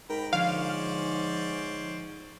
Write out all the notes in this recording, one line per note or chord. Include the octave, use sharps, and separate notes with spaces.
G#2 A#4 G5 A#5 B5
D3 F3 C#4 C5 D5 F5